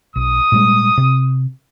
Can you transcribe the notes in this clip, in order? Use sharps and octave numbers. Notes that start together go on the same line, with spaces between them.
B1 D#6
A#2 G3 G#3
C3